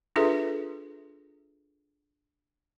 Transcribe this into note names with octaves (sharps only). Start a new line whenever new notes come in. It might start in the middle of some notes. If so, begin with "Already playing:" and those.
D4 F4 G#4 A4 B4 E5